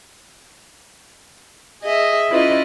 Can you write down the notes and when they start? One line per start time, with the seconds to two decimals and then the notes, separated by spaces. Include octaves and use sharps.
1.82 G#4 D#5 E5
2.29 C#4 E4 F4 B4 D5 D#5